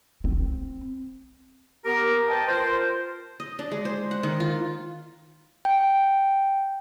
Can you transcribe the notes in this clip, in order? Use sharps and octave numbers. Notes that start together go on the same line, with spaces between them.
C4
B3 G4 A#4
B4 C5 D#5 G5 A5
F4 A#4 C5
D#5
D4
G#3
C5
F#5
D#3
F4
G5